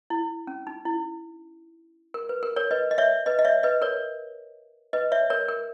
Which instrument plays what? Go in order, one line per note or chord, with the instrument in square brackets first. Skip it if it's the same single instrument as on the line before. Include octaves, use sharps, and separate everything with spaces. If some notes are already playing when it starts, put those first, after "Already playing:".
[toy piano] E4
C#4
D#4
E4
A#4
B4
A#4
A#4 C#5
B4 D#5
D#5
C#5 E5
B4 D#5
D#5
C#5 E5
B4 D#5
A#4 C#5
B4 D#5
C#5 E5
A#4 C#5
A#4